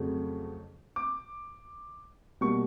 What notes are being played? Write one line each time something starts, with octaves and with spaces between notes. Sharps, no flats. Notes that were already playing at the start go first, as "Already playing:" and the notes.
Already playing: F2 C#3 F#3 A3
D6
B2 G3 A#3 C#6